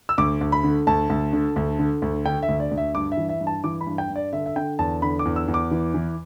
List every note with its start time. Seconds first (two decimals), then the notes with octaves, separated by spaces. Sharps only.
0.09 E6
0.18 D2 D6
0.41 D2
0.52 B5
0.64 D3
0.87 D2 A5
1.10 D2
1.33 D3
1.56 D2
1.79 D3
2.02 D2
2.26 D3 G5
2.43 E5
2.48 D2
2.60 D5
2.71 D2
2.77 E5
2.94 G2 D6
3.12 E5
3.17 E3
3.29 E5
3.41 G2
3.47 A5
3.64 E3 D6
3.81 B5
3.87 G2
3.98 G5
4.10 G2
4.16 D5
4.33 D3 E5
4.46 E5
4.56 D3 G5
4.79 E2 A5
5.02 D3 B5
5.19 D6
5.25 E2
5.36 E6
5.48 E2
5.54 D6
5.71 E3
5.94 E3